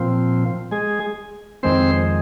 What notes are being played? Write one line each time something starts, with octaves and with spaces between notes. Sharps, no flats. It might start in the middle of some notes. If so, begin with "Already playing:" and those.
Already playing: A#2 F3 C4
G#3 G#4
F2 D#3 G#3 C4 C5